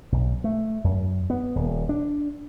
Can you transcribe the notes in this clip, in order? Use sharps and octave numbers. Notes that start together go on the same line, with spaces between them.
B1
A3
F#2
B3
D#1
D4